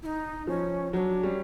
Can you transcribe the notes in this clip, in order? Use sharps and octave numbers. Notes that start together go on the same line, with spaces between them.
E4
D#4
F3 C#4
F#3 D4 D#4
G3 C#4